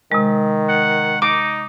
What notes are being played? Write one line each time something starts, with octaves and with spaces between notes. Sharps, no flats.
C3 D#3 G#3
F#5
D#4 D6